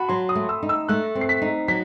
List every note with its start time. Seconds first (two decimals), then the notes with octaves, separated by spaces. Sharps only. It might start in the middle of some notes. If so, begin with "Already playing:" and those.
Already playing: F#4 A5 B5
0.09 F#3 C6
0.29 D#6
0.35 A3
0.49 E6
0.63 D#4
0.69 E6
0.88 A3 F#6
1.15 C4
1.21 C7
1.29 B6
1.42 D#4
1.68 F#3 B6